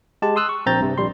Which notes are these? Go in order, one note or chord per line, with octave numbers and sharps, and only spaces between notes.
G#3 G4 A5
C6 D#6 E6 F#6
C#6
A#1 C4 A#5 G6 A6
G2 C3
A#1 G3 C6